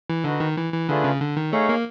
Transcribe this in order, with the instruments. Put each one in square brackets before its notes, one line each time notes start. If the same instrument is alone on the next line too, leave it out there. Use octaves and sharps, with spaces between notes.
[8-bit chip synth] E3
[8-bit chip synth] D3 [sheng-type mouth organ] D#4 F#4 B4
[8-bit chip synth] D#3
E3
E3
[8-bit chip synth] D3 [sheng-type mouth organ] A3 D4 F4 G#4 B4
[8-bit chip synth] C#3
D3
D#3
[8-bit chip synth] A3 [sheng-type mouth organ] D#4 G#4 C#5 F5
[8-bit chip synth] A#3